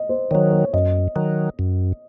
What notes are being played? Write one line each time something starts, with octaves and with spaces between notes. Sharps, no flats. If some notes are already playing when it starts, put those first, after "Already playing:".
Already playing: D#5
C5
D#3 F#3 C#5
C#5
F#2 D#5
D#3 F#3
F#2